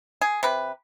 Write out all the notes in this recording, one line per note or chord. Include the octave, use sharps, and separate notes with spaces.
G#4
C3 B4